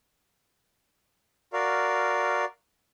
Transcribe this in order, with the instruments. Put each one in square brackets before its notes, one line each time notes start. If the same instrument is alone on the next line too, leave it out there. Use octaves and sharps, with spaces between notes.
[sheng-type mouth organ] F#4 A#4 D5 F5